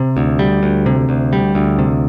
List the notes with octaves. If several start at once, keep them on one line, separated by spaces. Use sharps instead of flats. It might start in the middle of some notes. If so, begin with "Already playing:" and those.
Already playing: C3
D2
G3
D2
C3
D2
G3
D2
C3